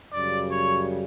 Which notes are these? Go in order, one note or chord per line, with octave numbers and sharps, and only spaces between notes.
F#2 C#3 G3 D5
C#5